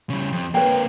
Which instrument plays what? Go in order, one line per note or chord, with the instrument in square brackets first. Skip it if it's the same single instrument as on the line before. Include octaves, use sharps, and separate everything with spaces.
[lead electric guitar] C#3 G3
F2
[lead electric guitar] A#3 C4 [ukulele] B4 C#5 G5